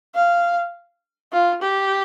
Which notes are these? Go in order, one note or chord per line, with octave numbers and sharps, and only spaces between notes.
F5
F4
G4